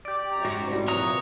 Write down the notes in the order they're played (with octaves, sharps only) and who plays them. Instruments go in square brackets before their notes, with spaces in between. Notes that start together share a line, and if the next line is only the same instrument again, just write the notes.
[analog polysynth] G4 D5
[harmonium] F#2 A#5
[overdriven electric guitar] G#2 [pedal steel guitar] F#4
[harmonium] A2 G3 [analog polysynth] C3
[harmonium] A#2 E3 [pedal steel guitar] F#3 A#5 D#6 [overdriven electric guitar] C#5